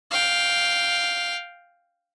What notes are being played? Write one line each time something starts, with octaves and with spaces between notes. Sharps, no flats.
F5 G5